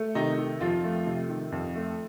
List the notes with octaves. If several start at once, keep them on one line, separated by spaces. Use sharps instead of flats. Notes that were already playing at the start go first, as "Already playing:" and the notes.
Already playing: A3
C3 D#3 D#4
D#3
F2 F3 F4
A3
C3
D#3
F2
A3